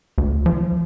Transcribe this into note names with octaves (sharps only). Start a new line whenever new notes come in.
D2
F3